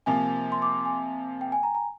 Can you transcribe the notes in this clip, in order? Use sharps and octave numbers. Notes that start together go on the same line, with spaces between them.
C3 F3 A#3 G#5
C6
D6
G#5
G5
G#5
A#5
A#5